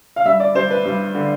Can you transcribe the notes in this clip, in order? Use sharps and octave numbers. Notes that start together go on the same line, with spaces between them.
F5
G2 E5
D5
G3 C5
B4
G2
D3